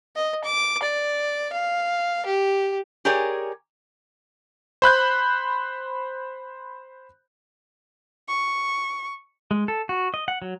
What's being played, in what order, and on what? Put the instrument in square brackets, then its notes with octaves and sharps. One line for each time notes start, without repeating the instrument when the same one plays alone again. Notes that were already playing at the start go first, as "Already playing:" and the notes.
[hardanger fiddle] D#5
D6
D5
F5
G4
[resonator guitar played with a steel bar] G4 G#4 A#4 C#5 D5 G#5
[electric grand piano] C5 B5 F#6 G6
[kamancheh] C#6
[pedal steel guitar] G#3
A4
F#4
D#5
F#5
F#3